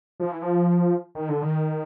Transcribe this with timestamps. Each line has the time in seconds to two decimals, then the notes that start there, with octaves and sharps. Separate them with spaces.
0.20 F3
0.31 E3
0.42 F3
1.15 D#3
1.29 D3
1.42 D#3